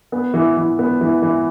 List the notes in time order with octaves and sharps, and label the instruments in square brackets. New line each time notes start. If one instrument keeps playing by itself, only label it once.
[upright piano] B3
E3
E3
B3
E3
E3